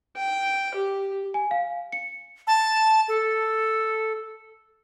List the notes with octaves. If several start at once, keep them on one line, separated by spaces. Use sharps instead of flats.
G5
G4
G#5
F5
C#7
A5
A4